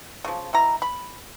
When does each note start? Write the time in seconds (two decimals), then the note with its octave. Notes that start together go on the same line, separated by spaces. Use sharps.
0.24 C#3 F3
0.53 B2 E4 A#5
0.82 B5